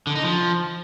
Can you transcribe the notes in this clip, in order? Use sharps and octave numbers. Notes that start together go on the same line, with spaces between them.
D3
D#4
F3